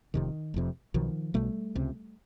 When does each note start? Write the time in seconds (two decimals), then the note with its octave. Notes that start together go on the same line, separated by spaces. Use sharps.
0.14 F1 F2 C3 D#3
0.54 F1 F2 C3
0.94 B1 B2 D#3 F3
1.34 B1 B2 G3 A3
1.75 C#2 C3